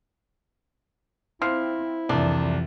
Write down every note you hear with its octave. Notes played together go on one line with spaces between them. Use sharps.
F3 C4 E4 F6
C2 F2 E3 D4